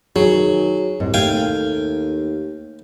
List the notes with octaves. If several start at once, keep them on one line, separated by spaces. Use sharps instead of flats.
D#3 F#3 G#4
C2 G#2
D#2 A3 F5 G5 G#5